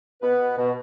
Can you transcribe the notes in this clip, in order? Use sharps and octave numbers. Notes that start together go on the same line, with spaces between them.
B2 B3 B4
B2
B2